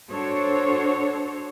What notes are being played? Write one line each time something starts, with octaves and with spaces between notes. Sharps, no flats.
D4 F#4 A4 C5 C#5